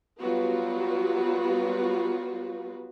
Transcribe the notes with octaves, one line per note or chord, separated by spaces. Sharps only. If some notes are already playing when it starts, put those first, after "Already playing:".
F#3 G3 B3 F4 F#4 B4